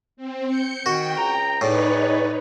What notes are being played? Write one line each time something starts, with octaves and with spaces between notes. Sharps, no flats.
C4
G6 C#7
D#3 F#4 G5
C#2 C#3 A#5
E2 A2 D#4 G#4 B4 C#5 D5